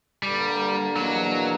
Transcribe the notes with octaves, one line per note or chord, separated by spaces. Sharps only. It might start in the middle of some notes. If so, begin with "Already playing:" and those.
G2 D3 G3 A#3
E2 B2 F#3 A#3 D4